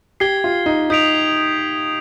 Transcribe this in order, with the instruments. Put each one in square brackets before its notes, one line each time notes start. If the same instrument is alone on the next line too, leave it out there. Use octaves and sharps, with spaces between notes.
[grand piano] G4 [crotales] G#6 C7 G7
[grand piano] F4
D#4
[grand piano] D#4 [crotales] D#6 G6 B6 D7 F7